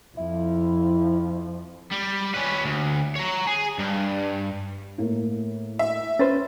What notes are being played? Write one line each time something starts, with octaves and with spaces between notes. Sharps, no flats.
F2 F3 E4
G3
C#4 B4
D2
C#5 A#5
G#4
G2
A2 A#3
E5
C#4 B4 C5 A6